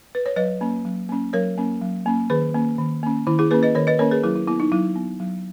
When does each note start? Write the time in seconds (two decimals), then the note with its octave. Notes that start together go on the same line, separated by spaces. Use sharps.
0.15 B4
0.26 C#5
0.36 F#3 B4 D#5
0.61 A#3 C#4
0.85 F#3
1.09 A#3 C#4
1.33 F#3 A#4 C#5
1.58 A#3 C#4
1.82 F#3
2.06 A#3 C#4
2.30 D#3 G#4 B4
2.54 A#3 C#4
2.78 D#3
3.03 A#3 C#4
3.27 D#3 E4
3.39 E4 G#4
3.51 A#3 C#4 G#4 B4
3.63 B4 D#5
3.75 D#3 A#4 C#5
3.87 B4 D#5
3.99 A#3 C#4 A#4 C#5
4.11 G#4 B4
4.24 F#3 E4 G#4
4.35 E4
4.48 B3 E4
4.60 D#4
4.72 F#3 E4
4.96 B3
5.20 F#3